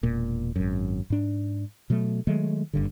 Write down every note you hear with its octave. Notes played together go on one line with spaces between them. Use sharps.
E1 A#2
G#1 F#2
G#2 D4
B2 F#3 A3
D#3 F#3 G#3 A3
F#1 G2 D3